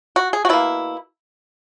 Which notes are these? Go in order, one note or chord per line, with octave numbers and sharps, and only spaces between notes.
F#4
G#4
F#4
B2 A#3 E4